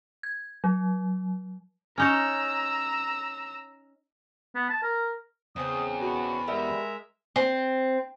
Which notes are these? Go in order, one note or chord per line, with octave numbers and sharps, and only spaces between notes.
G#6
F#3
C#4 D#4 C#5 A#5 E6
B3
A5
A#4
E2 C#3 C4 G5 D#6
B2 F#4 B5
G3 G#3 B3 A#4 E5
C4